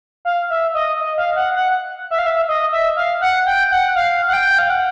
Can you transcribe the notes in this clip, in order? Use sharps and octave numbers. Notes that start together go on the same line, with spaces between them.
F5
E5
D#5
D#5
F5
F#5
F#5
E5
F5
E5
D#5
E5
F5
F#5
G5
F#5
F5
F#5
G5
F5
F#5